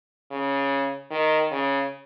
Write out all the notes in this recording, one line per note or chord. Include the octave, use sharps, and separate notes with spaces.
C#3
D#3
C#3